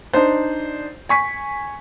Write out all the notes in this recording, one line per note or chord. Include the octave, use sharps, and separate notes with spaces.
D4 D#4 C5
G#5 C#6 B6